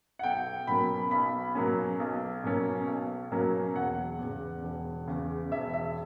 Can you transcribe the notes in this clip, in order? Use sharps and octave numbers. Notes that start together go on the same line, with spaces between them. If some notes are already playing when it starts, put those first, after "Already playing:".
F#5
B1 G5
B2 F#3 A#3 C#4 B5
B1 B5
B2 F#3 A#3 C#4
B1
B2 F#3 A#3 C#4
B1
B2 F#3 A#3 C#4
E1 F#5
E2 C#3
E1
E2 C#3
E1 E5
E5